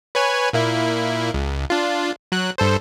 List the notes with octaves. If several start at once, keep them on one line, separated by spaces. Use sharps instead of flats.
B4 C#5 G#5
A#2 A#3 E4
C#2
D4 F4
F#3 F#6
G2 A4 C5